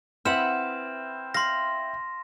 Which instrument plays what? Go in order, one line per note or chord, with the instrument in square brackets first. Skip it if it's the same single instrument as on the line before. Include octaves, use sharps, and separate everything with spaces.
[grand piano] C4 E4 [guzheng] B4 F#5 [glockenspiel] F6 E7
[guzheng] F5 [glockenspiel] C6 A#6